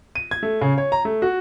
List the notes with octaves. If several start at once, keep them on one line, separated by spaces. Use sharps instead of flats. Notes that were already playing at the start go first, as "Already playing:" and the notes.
D#7
G#6
A3
C#3
C#5
A#5
A3
F#4